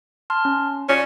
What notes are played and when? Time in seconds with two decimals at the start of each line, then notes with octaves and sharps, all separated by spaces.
0.30 A5 C6 F6
0.45 C#4
0.89 C#4 F4 D5 C#7